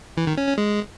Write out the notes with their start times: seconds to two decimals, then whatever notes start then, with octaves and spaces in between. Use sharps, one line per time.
0.17 E3
0.27 D#3
0.37 C#4
0.48 C#4
0.58 G#3